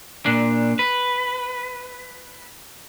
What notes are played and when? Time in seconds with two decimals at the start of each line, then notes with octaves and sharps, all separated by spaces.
0.26 A#2 D4
0.79 B4